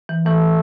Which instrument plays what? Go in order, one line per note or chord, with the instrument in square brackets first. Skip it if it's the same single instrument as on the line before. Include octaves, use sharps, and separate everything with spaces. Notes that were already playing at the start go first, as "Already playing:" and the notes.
[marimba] E3
[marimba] E3 [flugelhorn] A3